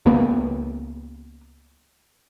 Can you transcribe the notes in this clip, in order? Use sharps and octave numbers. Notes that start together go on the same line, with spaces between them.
C#2 A#3 B3